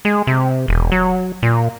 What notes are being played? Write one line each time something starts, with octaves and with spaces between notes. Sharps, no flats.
G#3
C3
E1
F#3
A#2